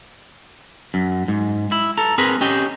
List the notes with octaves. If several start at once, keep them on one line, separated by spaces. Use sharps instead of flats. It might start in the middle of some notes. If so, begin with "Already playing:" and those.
F#2
G#2
E4
A4 A#5
C4 G#4 A#4 B4
C#4 G4 D#5 G5